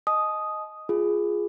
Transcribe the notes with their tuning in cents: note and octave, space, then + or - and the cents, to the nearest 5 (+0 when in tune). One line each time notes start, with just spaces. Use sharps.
D#5 +0 A5 -45 D#6 +0
F4 +0 G#4 +0